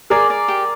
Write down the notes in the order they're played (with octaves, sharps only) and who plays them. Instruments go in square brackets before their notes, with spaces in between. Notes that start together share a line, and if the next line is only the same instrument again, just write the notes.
[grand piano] G#4 A#4 [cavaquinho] D5
[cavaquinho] D5
G4